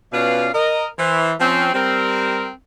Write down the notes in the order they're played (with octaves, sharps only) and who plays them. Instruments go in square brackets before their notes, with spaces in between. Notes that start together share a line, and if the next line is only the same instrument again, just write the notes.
[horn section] B2 C#4 F4 B4 D5 F5
A#4 D#5
E3 C5
F3 C4 C#4
G3 C4 A#4